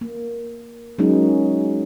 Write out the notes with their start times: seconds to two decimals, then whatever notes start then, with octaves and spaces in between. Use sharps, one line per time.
0.01 A#3
0.98 F#3 G#3 A#3 C#4 D#4